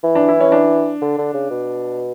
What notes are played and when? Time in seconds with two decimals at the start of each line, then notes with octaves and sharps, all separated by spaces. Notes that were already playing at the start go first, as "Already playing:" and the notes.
0.04 E3
0.15 D4
0.28 E4
0.40 C#4
0.52 D4
1.01 D3
1.18 D3
1.34 C#3
1.50 B2